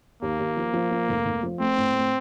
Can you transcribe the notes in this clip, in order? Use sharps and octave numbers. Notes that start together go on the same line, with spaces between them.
D#2 A#3
D#2
F3
F3
F3
F1
F1
F3
A3 C4
A2
A3